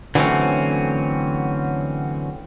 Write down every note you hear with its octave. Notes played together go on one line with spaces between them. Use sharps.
D3 E3 F#3 A3 C4 C#4